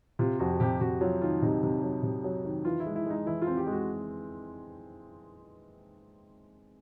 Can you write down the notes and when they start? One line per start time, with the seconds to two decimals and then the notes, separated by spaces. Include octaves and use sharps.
0.19 C3 F4
0.39 F2 F#4
0.53 F#4
0.60 C3 G4
0.81 C3 F#4
1.01 F#3 F4
1.21 D#3 F4
1.42 C3 D#4
1.63 C3
1.83 F#3
2.03 C3
2.24 F#3
2.45 D#3
2.65 E3 F4
2.80 E4
2.86 G#3
2.96 E4
3.06 G#3 D#4
3.26 E3 E4
3.42 F4
3.47 C4
3.57 G4
3.67 G#3
3.72 F#4